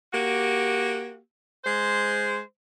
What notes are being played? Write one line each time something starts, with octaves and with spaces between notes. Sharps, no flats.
A#3 F#4 G4
G#3 C5